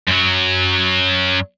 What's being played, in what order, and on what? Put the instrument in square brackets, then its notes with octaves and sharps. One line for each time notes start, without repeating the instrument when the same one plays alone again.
[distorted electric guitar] F#2 F#3